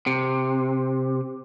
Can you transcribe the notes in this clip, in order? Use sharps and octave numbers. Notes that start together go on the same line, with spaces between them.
C3